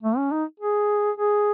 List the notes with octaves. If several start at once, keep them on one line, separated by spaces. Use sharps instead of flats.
A3
C#4
D#4
G#4
G#4